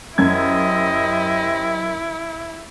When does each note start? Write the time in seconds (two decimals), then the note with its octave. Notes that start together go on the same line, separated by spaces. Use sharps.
0.18 F#2 E4 G4 C5 D#5 G#6